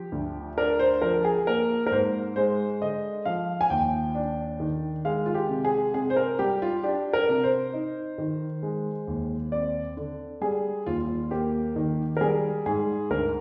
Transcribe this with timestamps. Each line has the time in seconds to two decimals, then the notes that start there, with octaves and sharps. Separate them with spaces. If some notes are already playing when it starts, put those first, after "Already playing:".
Already playing: F3 G4
0.12 D2
0.58 D4 A#4
0.79 C5
1.02 F3 A#4
1.25 G#4
1.47 A#3 A#4
1.87 A#4
1.91 G#2 C5
2.36 G#3 C5
2.81 D3 D#5
3.25 F3 F5
3.61 G#5
3.70 D#2 G5
4.15 D4
4.60 D#3
5.05 G#3 F5
5.26 F4
5.34 G4
5.49 C3
5.65 G#4
5.94 C3 G#4
6.10 C5
6.16 A#4
6.39 G3 G4
6.62 F4
6.83 D4 G4
7.13 A#4
7.29 C3
7.43 C5
7.73 D#4
8.18 D#3
8.63 G#3
9.07 D#2
9.52 C4 D5
9.97 D3
10.41 G3 G#4
10.86 D#2 F4
11.06 F4
11.31 A#3 G4
11.76 D#3
12.17 A#4
12.21 G3 G#4
12.66 G#2 G#4
13.10 D2 A#4